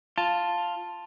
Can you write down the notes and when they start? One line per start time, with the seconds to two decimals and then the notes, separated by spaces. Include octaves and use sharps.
0.18 F4 A5